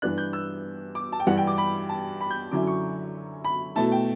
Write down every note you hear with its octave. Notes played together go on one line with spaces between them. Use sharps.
G2 E3 B3 D4 F#6
G6
E6
D6
A5
G5
G2 E3 G3 F#5
G5
D6
B5
A5
B5
G6
F#2 D3 F#3 C#4 E4 D6
C#6
B5
B2 A3 E4 A5
G5